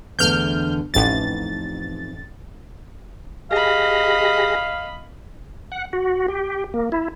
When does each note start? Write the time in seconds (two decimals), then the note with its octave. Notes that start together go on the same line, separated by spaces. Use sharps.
0.19 E2 D3 A3 F6 G6
0.94 A1 F2 D#4 A6
3.51 G4 G#4 D#5 F5 B5 A#6
5.72 F#5
5.93 F#4
6.28 G4
6.74 A#3
6.92 E4